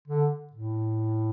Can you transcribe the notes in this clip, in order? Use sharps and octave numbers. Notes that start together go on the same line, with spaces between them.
D3
A2